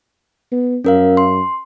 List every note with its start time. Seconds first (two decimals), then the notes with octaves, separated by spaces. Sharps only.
0.52 B3
0.85 F#2 C#4 A#4 F5
1.17 C6